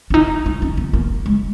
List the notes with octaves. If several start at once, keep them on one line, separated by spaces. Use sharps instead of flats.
C#4
D#4
D#4
C#4
B3
A#3
G#3